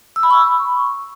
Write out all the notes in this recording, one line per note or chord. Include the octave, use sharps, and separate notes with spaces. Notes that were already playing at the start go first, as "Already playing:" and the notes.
E6
B5
C#6